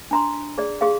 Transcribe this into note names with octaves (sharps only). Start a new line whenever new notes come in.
D4 A#5 C6
G#4 D5
G4 G#4 F5